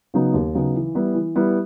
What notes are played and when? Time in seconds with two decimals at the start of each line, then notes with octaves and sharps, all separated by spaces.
0.14 C#3 F#3 B3 D#4
0.34 D#2
0.55 C#3 F#3 B3 D#4
0.75 E3
0.95 G3 B3 E4
1.14 E3
1.35 G3 B3 E4